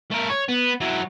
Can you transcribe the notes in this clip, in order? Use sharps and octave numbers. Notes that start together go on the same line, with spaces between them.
A3 A#4
C#5
B3
F#3 E4